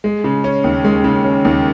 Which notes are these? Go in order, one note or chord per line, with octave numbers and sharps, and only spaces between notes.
G#3
C#3
C#4
D#2
G#3
C#3
C#4
D#2